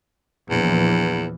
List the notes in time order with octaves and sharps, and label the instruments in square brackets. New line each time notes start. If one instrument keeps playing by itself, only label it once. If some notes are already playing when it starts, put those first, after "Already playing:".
[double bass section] A#1 E3 F3 [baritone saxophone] E2